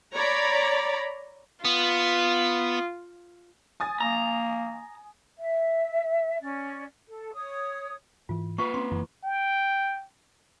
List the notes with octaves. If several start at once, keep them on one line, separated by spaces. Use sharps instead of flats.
C#5 D5 A#5 B5
B3 F4
G#5 D#6 A6
A#3 A#5
E5
C#4 D5
A4
C#5 D#6
G#2 E3 F4
A#3 F4 B4 E5 C#6
C4 C#4 C6
F1 F#2 E3 E4
G5